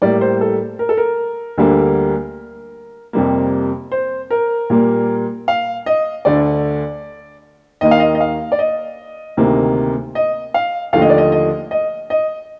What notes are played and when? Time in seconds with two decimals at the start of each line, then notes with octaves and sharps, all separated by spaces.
0.02 A2 G3 A#3 D5
0.21 C5
0.41 A4
0.79 A#4
0.89 A4
0.97 A#4
1.58 D2 D3 G3 A#3
3.13 F2 C3 G3 A#3
3.92 C5
4.31 A#4
4.70 A#2 G3 A#3
5.48 F5
5.86 D#5
6.25 D2 D3 A3 D5
7.81 D#2 D#3 A#3 D#5
7.91 F5
8.00 D#5
8.15 D#5
8.20 F5
8.52 D5
8.59 D#5
9.37 D2 C3 D#3 A#3
10.15 D#5
10.54 F5
10.93 D#2 D3 F3 A3 F5
11.02 D#5
11.10 D5
11.18 D#5
11.32 D#5
11.71 D#5
12.10 D#5